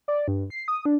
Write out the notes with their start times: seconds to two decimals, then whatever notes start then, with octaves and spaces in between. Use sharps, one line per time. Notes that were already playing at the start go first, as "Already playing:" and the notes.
0.08 D5
0.28 G2
0.50 C7
0.68 D#6
0.85 D4